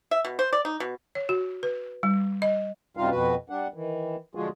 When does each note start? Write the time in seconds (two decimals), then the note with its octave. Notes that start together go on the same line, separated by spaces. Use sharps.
0.11 E5
0.25 B2
0.39 C5
0.53 D5
0.65 D#4
0.80 B2
1.15 C#5
1.29 F#4
1.63 B4
2.03 G3
2.42 D#5
2.97 F#2 C3 G3 D#4 F4 F5
3.10 F2 B2 F#4 B4
3.50 G3 D4 F#5
3.74 D#3 E3
4.35 D3 F3 G#3 F4 F#4 G#4